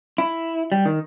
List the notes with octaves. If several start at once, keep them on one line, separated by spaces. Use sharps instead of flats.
E4
G3
D#3